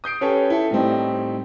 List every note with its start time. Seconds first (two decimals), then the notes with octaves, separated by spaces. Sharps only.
0.04 D#6 G6 C7 D7
0.21 C#4 G4 A4 B4 C#5
0.50 E4 A4
0.71 A2 G3 C4 D#4